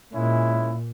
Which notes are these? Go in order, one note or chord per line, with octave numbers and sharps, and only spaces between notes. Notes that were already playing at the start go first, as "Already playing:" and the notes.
A#2 G#3 C#4 E4